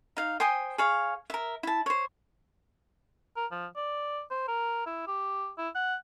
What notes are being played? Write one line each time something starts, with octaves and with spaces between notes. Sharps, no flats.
D#4 F5
C5 G5 G#5 D#6
G#4 C#5 F5
A#4 E5
E4 A5
C5 C#5
A#4
F3
D5
C5
A#4
E4
G4
E4
F#5